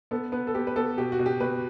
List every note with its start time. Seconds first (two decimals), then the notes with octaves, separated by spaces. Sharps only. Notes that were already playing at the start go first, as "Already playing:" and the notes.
0.11 B3 A4
0.32 B3 B4
0.47 A4
0.54 B3 G4
0.67 B4
0.76 B3 A4
0.97 B2 G4
1.12 F#4
1.19 B2
1.26 G4
1.40 B2 B4